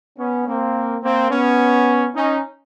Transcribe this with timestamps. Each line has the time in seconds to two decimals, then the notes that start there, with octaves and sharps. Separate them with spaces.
0.18 B3 C#4
0.47 A#3 C4
1.02 A#3 C4
1.31 B3 C#4
2.15 C#4 D#4